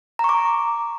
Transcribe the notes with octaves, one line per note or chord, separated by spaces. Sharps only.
A#5 C#6 D6